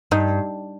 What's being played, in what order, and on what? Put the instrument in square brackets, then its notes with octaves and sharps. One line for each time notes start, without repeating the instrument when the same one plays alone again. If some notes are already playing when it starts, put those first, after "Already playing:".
[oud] G2 [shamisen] D#4